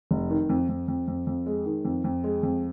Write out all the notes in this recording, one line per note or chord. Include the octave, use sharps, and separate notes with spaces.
F1
D#3
F2
F2
F2
F2
F2
G#3
D#3
F2
F2
G#3
F2